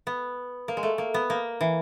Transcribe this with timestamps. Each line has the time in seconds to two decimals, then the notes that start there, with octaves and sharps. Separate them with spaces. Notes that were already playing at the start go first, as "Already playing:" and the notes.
0.07 B3
0.68 A#3
0.77 G#3
0.83 A3
0.98 A#3
1.14 B3
1.30 A#3
1.61 E3